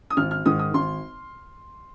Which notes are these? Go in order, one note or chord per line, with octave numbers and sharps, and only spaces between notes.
D#6
G#1 F6
F6
G#2 D#3 D#6
D#6
G#1 C6